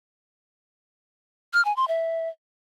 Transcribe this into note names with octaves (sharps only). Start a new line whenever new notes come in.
F6
G#5
C6
E5